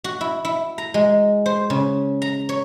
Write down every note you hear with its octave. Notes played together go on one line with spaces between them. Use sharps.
F#4
E4
E4
A#5
G#3
C5
C#3
A#5
C#5